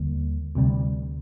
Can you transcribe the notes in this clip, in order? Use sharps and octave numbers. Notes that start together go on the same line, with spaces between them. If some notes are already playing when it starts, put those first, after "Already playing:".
Already playing: D#2 D3 G3 A#3
D2 C3 G3